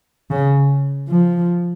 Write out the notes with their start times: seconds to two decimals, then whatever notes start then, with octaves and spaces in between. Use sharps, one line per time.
0.30 C#3
1.09 F3